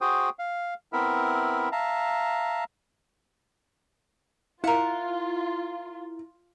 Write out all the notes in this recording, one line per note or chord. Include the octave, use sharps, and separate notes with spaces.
F#4 G#4 C5 G5 D#6
F5
B3 C4 E4 A#4 E5
E5 F5 A5 A#5
E4 F4 A#4 F5 F#5